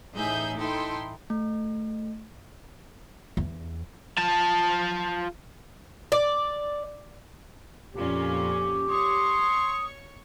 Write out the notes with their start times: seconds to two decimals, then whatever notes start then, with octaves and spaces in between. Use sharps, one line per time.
0.16 A1 A2 D#4 G#4 E5 G6
0.57 D#4 E4 A4 G5 C6
1.30 A3
3.37 E2
4.18 F4 A5
6.12 D5
7.94 F2 A#2 C#4 G4
8.89 C#5 C6 C#6 D#6